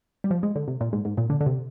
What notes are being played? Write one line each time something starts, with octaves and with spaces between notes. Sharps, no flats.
G3
F3
G#3
D3
C3
A#2
G#2
G#2
A#2
D3
D3
C3